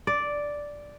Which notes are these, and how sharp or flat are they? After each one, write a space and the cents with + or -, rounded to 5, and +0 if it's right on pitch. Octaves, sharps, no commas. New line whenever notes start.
D5 -5